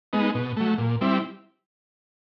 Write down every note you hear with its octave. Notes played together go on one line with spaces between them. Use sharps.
G#3 B3 D#4
B2
F#3 A3
A#2
G3 C4 E4